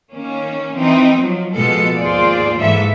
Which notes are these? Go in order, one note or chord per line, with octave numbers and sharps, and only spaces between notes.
D#3 A#3 C#4
E3 C4 D#4
F3 F#3
B2 F3 G#3 A#3 A4
D#2 G#2 F4 G#4 C5 D5
G#2 E3 A#3 A4 E5